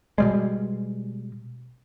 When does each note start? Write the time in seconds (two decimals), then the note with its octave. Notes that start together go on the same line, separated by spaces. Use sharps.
0.18 B2 G3 G#3